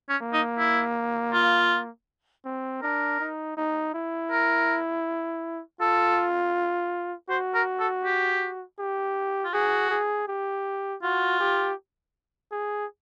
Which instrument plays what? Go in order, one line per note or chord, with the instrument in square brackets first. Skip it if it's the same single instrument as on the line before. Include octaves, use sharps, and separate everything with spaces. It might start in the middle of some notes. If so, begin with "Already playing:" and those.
[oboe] C#4
[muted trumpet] A#3
[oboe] D#4
E4
F4
[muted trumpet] C4
[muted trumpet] D4 [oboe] A#4
[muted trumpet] D#4
D#4
E4
[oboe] A#4
[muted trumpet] F4 [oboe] A4
[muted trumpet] F#4 [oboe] C5
[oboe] A#4
A4
G4
[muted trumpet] G4
[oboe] F4
[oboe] F#4 [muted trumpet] G#4
[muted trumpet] G#4
G4
[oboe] F4 [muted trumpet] F#4
[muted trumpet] G4
G#4